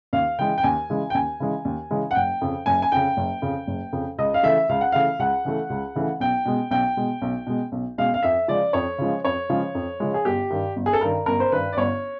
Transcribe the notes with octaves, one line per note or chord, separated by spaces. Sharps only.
D#2 F5
C#3 E3 G#3 G5
G5
D#2 G#5
C#3 E3 G#3
G5
D#2 G#5
C#3 E3 G#3
D#2
C#3 E3 G#3
F#5
F#1 G5
F2 C#3
F#1 G#5
G#5
F2 C#3 G5
F#1
F2 C#3
F#1
F2 C#3
C#2 D#5
F5
C#3 E3 A3 E5
C#2 F5
F#5
C#3 E3 A3 F5
C#2 F#5
C#3 E3 A3
C#2
C#3 E3 A3
B1 G5
B2 G#3
B1 G5
B2 G#3
B1
B2 G#3
B1
B2 G#3 F5
F5
F2 E5
C#3 F3 G#3 D5
F2 C#5
C#3 F3 G#3
F2 C#5
C#3 F3 G#3
F2
C#3 F3 G#3
G#4
G1 G4
G2 D#3
G1
G#4
A4
G2 D#3 A#4
G1 A#4
C5
G2 D#3 B4
D5
G1 C#5